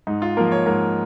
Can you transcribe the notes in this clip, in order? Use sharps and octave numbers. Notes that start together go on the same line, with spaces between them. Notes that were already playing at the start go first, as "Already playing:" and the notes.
G#2 D#4
F4
F3 A#3 A#4
C#5
G#2 A#4